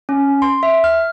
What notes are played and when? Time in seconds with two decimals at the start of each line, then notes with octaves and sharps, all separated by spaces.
0.09 C#4
0.42 C6
0.63 E5
0.84 F6